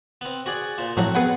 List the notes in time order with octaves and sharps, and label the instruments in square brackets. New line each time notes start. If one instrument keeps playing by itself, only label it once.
[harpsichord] B3 C4
F#4 G#4 D5
A#2 C5
[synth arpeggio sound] A2 F3 F#3 [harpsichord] C4 F#4
[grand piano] B3 [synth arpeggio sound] G#4 B4 F#5